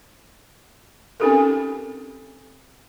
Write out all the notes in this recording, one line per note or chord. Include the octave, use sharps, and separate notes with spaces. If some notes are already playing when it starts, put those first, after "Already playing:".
C4 C#4 D#4 G4 A4 A#4